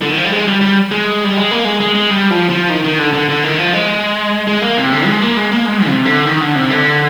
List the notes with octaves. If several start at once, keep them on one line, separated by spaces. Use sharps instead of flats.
D3
D#3
F3
G3
G#3
G3
G3
G#3
G3
G#3
A#3
G#3
G#3
G#3
G3
F3
F3
D#3
D#3
D3
D3
D3
D#3
F3
G#3
G#3
A#3
C3
D3
G#3
A#3
G#3
A#3
G#3
C3
D3
D#3
D3
C3
D3